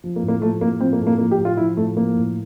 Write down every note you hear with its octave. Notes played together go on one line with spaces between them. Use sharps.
F3
A#3
A2
A#3
F3 A3
A2 A#3
F3 C4
A#3
A2 A3
A#3
F3 A#3
G4
A2
F4
F3 E4
A2 A3
F3 A#3
A2